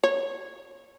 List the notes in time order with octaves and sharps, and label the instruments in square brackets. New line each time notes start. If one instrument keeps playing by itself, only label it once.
[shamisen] C#5